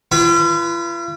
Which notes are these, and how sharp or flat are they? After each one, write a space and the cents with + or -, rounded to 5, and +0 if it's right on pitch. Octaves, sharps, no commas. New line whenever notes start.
F4 -45 B4 -10